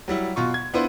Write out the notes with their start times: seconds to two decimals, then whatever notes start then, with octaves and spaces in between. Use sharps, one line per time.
0.08 F#3 G3 E4
0.36 B2 F4 C#6
0.54 G#6
0.74 B3 D4 E4 F4 B4 C5